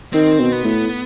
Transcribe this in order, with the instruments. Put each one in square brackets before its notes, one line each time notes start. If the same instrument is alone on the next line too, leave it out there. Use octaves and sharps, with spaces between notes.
[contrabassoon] D#3 [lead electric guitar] C4
[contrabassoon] B2
[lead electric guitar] B3
[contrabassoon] A2